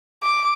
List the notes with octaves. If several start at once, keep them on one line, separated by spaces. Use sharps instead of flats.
D6